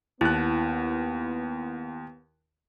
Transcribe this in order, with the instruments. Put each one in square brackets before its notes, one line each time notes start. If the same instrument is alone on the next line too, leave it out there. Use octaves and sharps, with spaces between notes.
[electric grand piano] D#2 F#6 [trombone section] B3 [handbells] E4